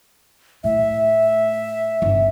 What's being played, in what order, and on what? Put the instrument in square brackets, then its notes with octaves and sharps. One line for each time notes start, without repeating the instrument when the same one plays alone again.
[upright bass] A2 [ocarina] E5
[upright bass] G1 C#3